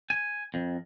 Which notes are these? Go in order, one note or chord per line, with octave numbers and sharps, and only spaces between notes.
G#5
F2